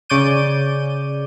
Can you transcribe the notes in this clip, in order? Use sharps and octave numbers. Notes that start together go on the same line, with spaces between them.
C#3 C#5 D5 D6 G6 D#7